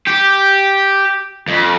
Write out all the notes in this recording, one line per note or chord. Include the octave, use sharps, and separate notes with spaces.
G4
F2